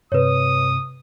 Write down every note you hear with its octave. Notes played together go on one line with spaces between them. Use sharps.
G2 C3 B4 C#5 D#6